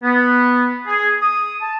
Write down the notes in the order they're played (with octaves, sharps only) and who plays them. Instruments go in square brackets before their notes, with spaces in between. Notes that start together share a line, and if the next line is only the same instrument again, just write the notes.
[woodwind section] B3
G#4
D#6
A5